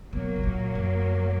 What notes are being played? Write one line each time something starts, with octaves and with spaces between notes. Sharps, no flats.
B2 F#3 A#3
B2
A#2
F#2